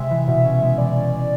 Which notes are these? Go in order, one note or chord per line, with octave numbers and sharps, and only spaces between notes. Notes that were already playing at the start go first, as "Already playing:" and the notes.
Already playing: C3 G#3 E5
E3
B2
C#4
G#3
E3 D5
C#4
G#3